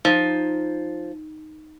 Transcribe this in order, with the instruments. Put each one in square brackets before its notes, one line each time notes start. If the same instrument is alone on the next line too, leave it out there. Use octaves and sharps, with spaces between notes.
[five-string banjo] F3 [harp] D#4 D#7